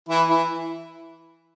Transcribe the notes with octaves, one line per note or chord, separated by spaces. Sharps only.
E3 E4
E3 E4